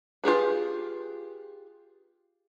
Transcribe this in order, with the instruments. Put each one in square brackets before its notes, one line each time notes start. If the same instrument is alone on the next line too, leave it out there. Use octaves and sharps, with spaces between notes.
[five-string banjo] F4 G4 G#4 B4